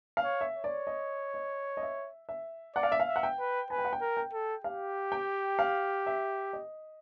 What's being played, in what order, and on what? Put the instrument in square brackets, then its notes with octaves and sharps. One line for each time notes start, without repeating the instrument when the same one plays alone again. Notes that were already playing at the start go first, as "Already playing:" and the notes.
[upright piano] F5
[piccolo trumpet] C#5
[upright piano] E5
[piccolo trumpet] C#5
[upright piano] D5
D#5
D#5
D#5
E5
E5
[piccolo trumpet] D5 [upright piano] F#5
[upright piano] F5
E5
F5
[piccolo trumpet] E5
[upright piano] F#5
G5
[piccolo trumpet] B4
[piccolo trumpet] B4 [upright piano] G#5
[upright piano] G5
F#5
G5
[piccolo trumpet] A#4
[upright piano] G5
[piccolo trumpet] A4
[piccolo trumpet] G4 [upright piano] F5
[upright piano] G5
F5
E5
D#5